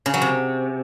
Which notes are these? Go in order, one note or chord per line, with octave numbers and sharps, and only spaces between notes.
C#3
F#3
C3